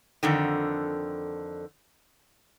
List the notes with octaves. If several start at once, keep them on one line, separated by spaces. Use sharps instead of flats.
F2 D3 D#3